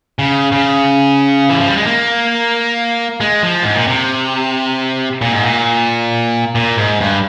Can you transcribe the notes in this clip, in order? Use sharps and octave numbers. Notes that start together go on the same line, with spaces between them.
C#3
C#3
E3
F3
G3
G#3
A#3
G#3
F3
G#2
A#2
C3
A#2
G#2
A#2
A#2
G#2
G2